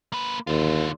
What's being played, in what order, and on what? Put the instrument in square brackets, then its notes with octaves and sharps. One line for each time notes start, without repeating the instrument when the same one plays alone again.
[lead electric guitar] A#3 B4
[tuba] D#2 [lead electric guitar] D3 F4